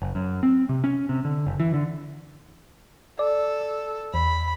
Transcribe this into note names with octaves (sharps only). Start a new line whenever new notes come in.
F#1
F#2
C4
C3
C#4
C3
D3
F#1
E3
D3
A4 D5
E2 B5